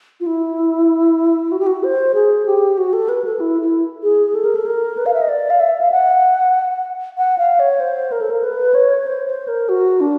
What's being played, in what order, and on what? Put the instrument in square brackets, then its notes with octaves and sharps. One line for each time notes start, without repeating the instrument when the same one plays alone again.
[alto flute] F4
E4
F#4
G4
F#4
C5
G#4
G4
F#4
A4
B4
A4
E4
E4
G#4
A4
A#4
A4
A#4
B4
F5
E5
D#5
D5
F5
E5
F5
F#5
F#5
F5
C#5
C5
A#4
A4
A#4
B4
C#5
C5
C5
A#4
F#4
D4